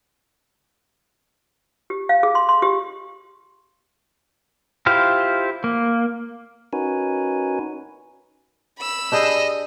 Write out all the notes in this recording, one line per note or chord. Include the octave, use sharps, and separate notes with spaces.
G4
F5
G#4
C6
C6
G4
E4 F4 G4 C5 F5
A#3
C#4 D#4 F#4 A#4 B4 G#5
B5 E6
D4 G4 G#4 D#5